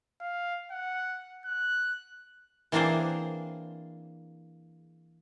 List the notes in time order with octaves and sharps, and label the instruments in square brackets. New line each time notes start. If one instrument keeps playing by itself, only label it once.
[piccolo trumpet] F5
F#5
F#6
[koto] E3 A#3 C4 D4 G#4 C5